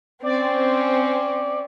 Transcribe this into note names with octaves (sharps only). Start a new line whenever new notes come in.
C4 C#4 D5